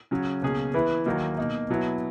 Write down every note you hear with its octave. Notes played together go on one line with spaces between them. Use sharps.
C#3 F#3 C#4
C#2 B2 A#3 C#4 G#4
E3 B3 E4 B4
D#2 D#3 F#3 A#3 D#4
B2 A#3 D#4
B2 F#3 B3 E4